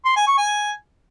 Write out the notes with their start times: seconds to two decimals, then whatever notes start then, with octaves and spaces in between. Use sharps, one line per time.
0.05 C6
0.16 G#5
0.27 C#6
0.38 G#5